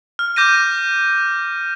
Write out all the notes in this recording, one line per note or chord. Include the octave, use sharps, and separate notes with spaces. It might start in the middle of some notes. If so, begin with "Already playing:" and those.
F6
D6 G6 A#6 D#7